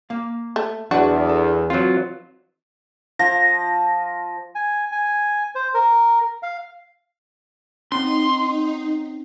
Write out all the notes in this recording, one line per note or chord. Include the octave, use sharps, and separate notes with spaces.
A#3 F5
A3
E2 F#3 D4 F#4 B4
A4
F#3 C4 F4 B4
F3 A#6
G#5
G#5
C5
A#4
F5
C4 C#4 D#4 C6